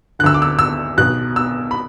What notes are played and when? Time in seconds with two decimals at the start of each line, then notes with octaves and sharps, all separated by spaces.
0.19 D3 F#6
0.24 D2 E6
0.34 D6
0.42 E6
0.59 E6
0.98 B1 B2 F#6
1.36 E6
1.71 B5